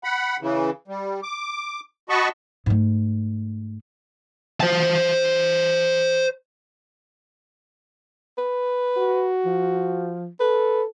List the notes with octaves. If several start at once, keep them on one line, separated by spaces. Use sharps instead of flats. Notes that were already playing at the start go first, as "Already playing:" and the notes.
F#5 B5
C#3 E3
G3
D6
F#4 D#5 A5 B5 C#6
G#2 A3
C5 A5
B4
F#4
F3
A4 B4